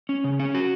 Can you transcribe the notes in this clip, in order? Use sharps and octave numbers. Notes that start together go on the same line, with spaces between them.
C#4
C#3
C#4
F#4